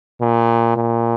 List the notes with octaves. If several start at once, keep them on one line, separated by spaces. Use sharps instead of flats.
A#2
A#2